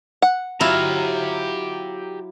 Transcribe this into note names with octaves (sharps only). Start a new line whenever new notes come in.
F#5
F#3 E4 F4 G4 A#5